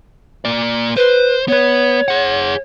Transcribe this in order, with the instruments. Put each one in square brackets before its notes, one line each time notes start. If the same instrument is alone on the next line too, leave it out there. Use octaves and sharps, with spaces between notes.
[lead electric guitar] A#3 D5
[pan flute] B4 [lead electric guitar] C5
[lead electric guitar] B3 B4 [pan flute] C#5
[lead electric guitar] G#4 F#5